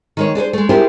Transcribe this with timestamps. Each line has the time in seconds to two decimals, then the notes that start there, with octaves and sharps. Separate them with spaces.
0.17 D#3 G#3 C#5
0.35 D4 G#4 B4 C5
0.53 G#3 A3
0.69 E4 F4 G4 G#4 A#4 C5